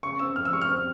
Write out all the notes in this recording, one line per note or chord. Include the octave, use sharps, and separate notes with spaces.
C#3 C#6
C4 E6
F2 F6
E6
G3 C#6
F6
C4